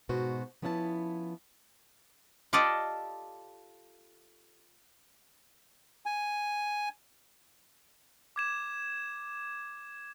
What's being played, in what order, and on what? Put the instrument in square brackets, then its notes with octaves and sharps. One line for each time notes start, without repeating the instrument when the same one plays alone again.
[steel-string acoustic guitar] G#2 B2 F#4 C5
F3 B3 C#4 E4 F5 A5
[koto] F4 G4 A4 D5 D#5
[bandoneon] G#5
[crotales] D6 G#6 E7